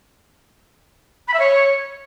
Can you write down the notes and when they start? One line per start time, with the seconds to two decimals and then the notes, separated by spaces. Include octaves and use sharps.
1.28 B5
1.34 E5
1.39 C#5